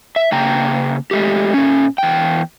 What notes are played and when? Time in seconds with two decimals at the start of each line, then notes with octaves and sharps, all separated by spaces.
0.16 E5
0.32 C#3 A#3 G5 A#5
1.11 G#3 A3 G4
1.54 A#2 C#4
1.98 E2 G5